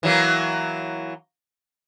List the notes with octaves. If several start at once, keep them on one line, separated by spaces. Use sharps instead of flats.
E3 F#3 A#3